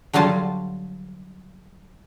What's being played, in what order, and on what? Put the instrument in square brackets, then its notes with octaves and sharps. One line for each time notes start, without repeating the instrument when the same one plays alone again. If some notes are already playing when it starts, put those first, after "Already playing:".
[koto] D3 F#3 G3 F4 A5